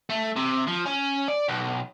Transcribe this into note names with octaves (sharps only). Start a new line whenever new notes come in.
A3
C3
F3
C#4
D5
B1